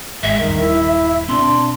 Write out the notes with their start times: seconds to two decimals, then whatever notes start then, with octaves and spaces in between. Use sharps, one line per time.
0.23 G#1 G#3 E5
0.39 D#1 G2 D#3
0.61 E4
1.29 B2 C4 D4 C6